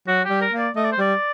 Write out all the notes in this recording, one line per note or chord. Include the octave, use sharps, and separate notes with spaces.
F#3 F#4
G4
G3
A#4
A#3
D5
A3 D#5
D5
C5
G3 D5